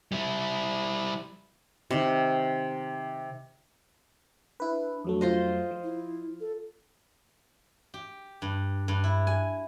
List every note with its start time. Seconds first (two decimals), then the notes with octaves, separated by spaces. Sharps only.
0.12 G3 E4
1.91 C3 D#3
4.60 D4 E4 B4
5.05 F2 F#3 A3
5.21 F4 C5 D#5
5.71 F3
5.83 E4
6.40 A4
7.94 G4
8.42 G2
8.88 G2
9.04 E4
9.27 G#5